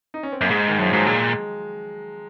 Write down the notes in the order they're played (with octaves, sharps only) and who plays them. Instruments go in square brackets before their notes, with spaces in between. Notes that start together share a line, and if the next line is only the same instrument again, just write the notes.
[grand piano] D#4
C#4
C4
[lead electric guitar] F#2 [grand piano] A#3
[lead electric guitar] G#2 [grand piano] G#3
[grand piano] D#3
[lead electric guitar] F#2 [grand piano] F3
[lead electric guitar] G#2 [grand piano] F#3
[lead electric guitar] A#2 [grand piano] G#3